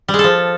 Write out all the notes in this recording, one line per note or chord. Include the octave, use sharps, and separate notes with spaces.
G3
G#3
A4
F3